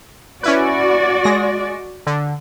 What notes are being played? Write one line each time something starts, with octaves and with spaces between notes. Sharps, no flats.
C#4 E4 F#4 B4 D5
G#3 A#6
D3